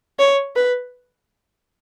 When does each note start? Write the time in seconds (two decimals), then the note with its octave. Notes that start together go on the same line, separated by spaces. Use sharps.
0.19 C#5
0.56 B4